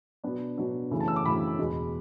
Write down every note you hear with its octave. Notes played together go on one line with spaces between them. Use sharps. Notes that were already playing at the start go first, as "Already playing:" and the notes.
B2 F#3 B3 D4
B2 F#3 B3 D4
F#2 C#3 E3 A3 E4
A5
E6
D6
F#2 C#3 E3 A3 E4 B5
E2 B2 G#3